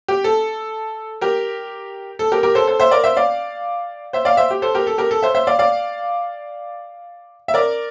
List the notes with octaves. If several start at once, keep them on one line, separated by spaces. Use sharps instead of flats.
G4
A4
G4 A#4
A4
G4 A#4
G4 A#4
A4 C5
A4 C5
C5 E5
A#4 D5
C5 E5
D5 F5
C5 E5
D5 F5
C5 E5
G4
A4 C5
G4 A#4
A4
G4 A#4
A4
C5 E5
C5 E5
D5 F5
D5 F5
E5
A#4 D5